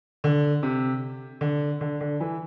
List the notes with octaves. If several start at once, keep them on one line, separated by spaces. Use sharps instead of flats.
D3
C3
D3
D3
D3
E3